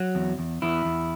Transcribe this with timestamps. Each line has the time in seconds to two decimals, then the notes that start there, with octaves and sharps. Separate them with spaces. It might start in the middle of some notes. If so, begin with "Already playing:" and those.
Already playing: F#3
0.15 E2
0.39 E2
0.62 E2 E4
0.85 E2